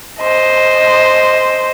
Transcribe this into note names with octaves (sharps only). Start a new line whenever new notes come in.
C5 D#5